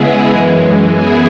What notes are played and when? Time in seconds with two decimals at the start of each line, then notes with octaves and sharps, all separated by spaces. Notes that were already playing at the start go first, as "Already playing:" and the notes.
Already playing: C#3 G#3 B3 E4 G#4
0.29 F#2 E3 G#3
0.90 F#2 E3 B3 E4 G#4